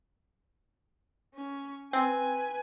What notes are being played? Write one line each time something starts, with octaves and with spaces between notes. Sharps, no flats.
C#4 C#6
C4 B4 G#5